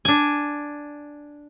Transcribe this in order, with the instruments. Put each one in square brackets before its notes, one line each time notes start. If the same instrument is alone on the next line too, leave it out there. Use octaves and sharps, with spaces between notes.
[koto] D4 G#5